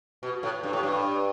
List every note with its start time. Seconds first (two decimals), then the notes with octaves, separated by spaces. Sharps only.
0.23 B2
0.43 A2
0.63 G2
0.73 A2
0.83 G2